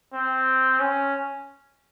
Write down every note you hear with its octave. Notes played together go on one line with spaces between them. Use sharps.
C4
C#4